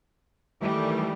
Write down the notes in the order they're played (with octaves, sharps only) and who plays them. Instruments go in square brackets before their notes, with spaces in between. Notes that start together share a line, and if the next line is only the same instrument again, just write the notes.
[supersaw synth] D#3 E3 A3 [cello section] G3